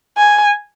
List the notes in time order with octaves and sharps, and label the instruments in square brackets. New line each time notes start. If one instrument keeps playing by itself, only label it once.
[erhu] G#5